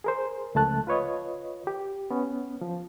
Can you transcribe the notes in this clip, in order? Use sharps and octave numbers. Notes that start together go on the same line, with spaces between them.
G#4 A#4 C5
C#2 F3 A3 A5 F#6
F4 B4 C#5 D#5
G4
B3 C#4
F3